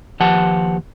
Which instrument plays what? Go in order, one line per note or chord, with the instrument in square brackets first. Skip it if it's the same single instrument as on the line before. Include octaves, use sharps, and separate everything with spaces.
[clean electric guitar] D#2 F3 G4 B4 F#5 A5